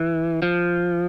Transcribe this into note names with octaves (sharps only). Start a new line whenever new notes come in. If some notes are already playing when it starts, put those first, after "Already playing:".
Already playing: E3
F3